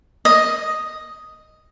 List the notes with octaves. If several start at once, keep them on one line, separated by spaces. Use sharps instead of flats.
D#5